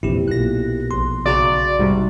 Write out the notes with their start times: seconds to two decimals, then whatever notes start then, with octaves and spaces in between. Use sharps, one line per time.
0.03 A#1 E2 C3 E4 G4
0.28 B1 A#2 F#6 A#6
0.91 A#1 C6
1.26 C#3 F#4 D5 A#5
1.79 G#2 C3 G3 F#4